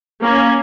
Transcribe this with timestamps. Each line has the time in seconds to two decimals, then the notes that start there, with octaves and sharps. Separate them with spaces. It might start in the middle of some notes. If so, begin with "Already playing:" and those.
0.22 A#3 C#4